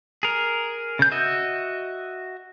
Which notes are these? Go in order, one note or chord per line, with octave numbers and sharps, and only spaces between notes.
G#4 A#4
C#3 G6
F#4 D#5 E5